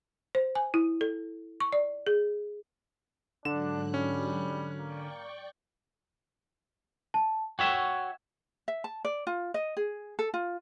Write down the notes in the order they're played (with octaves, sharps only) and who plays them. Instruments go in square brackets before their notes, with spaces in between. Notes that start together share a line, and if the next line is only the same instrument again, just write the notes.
[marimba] C5
G#5
E4
A4
C#6
D5
G#4
[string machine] G#2 F#3 F#6 [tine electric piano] D3 [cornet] D4 [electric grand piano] E7
[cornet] G3 [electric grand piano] C#4
[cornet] A#3 [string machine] D5 G5 C#6
[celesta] A5
[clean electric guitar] F#4 C#5 E5 [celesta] G5
[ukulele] E5
A5
D5
F4
D#5
G#4
A4
F4